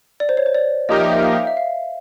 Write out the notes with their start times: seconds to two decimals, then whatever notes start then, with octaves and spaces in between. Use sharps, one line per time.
0.20 D5
0.29 C5
0.37 C#5
0.46 C5
0.55 D5
0.89 F3 A#3 D#4 G4 A#4 D#5
1.00 E5
1.12 E5
1.23 F5
1.47 E5
1.57 F5